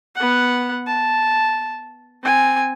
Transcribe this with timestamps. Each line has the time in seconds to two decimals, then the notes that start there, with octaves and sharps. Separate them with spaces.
0.15 B3 F#5
0.86 A5
2.23 C4 G#5